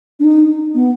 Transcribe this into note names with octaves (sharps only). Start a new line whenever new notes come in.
D4
D#4
B3